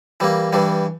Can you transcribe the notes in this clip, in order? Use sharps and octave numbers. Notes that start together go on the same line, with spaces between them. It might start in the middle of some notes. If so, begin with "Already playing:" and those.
E3 G3 A#3
G2 E3 G3